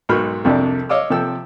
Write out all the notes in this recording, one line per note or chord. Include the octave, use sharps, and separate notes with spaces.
B1 G#2 F#4 A#4 B5 F6
C2 F2 C3 D4
C#5 D#5 F5 D6 E6
C3 F3 A4 G5 E6